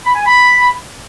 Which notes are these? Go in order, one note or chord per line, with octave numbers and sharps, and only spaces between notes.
B5
G#5
B5